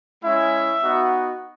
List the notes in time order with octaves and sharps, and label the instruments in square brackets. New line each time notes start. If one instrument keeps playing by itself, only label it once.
[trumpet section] G#3 C#4 E4 E5
B3 D#4 F#4